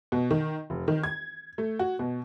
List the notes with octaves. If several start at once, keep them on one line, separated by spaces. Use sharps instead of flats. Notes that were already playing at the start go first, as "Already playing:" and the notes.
B2
D#3
F1
D#3
G#6
A3
F#4
B2